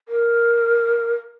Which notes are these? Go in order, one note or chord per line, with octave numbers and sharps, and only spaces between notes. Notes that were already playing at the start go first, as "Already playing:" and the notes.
A#4